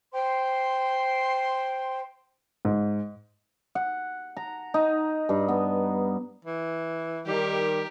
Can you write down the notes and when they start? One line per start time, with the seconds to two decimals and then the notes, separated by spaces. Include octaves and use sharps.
0.12 C5 G5 C6
2.65 G#2
3.75 F#5
4.37 A#5
4.74 D#4
5.29 G2
5.48 B3
6.45 E3
7.27 D#3 G3 G4 A#4